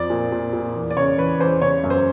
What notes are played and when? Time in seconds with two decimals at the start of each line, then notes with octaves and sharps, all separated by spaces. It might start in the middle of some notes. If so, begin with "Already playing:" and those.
Already playing: F2 F3 D5
0.10 A#2
0.32 A#2
0.53 A#2
0.75 E2
0.90 D5
0.97 C#3 C#5
1.18 E3 B4
1.40 E2 C5
1.62 C#3 C#5
1.84 F#2
1.90 C5